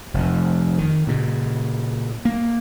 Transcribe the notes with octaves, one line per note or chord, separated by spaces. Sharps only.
F1 F2
D#3
A#2 C#3
A#3